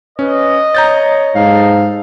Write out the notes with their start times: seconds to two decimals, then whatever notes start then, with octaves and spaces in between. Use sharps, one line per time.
0.19 C#4 B4 D#5
0.75 C#5 A#5 G6 A6
1.35 G#2 D#4 A4 F5